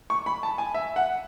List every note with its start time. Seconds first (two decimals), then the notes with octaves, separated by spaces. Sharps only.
0.10 C#6
0.26 B5
0.43 A5
0.58 G#5
0.74 E5
0.96 F#5